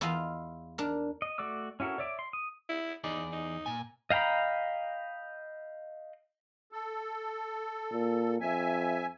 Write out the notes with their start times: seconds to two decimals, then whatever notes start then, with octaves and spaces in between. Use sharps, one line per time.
0.01 E2 E4 F4 D#5 F5
0.78 D4 A#4
1.22 D#5
1.38 A3 F#4 D5 D6 E6
1.80 C#4 E4 F#4 A4 A#4
1.98 C#5 D5 E5 D6
2.19 C6
2.33 D#6
2.69 E4
3.04 E2 D#4 G#4 D5
3.32 D#4
3.66 A#2 G#5
4.10 D#5 F5 G5 A#5 B5
6.72 A4
7.92 A#2
8.41 F2 E5 G#5